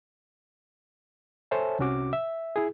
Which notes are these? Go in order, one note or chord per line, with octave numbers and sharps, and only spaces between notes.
A4 C5 C#5 E5 G#5 A5
C2 C3 C#4 F#4 D6
E5
E4 G#4